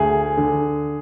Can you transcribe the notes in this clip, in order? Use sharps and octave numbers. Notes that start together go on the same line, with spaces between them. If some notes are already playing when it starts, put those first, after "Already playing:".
Already playing: D2 G#4
D3